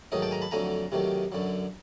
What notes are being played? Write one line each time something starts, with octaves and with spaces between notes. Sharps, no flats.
G#2 D#3 F#3 A3 C#5 D#5
G5 A5
G#5 A#5
A5 B5
F2 D3 F#3 A3 G#5 A#5
C3 D#3 F#3 A3
F#2 D3 F#3